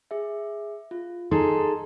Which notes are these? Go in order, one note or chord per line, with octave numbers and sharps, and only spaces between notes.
G#4 E5
F4
D#4 G#4 A4 A#5 C6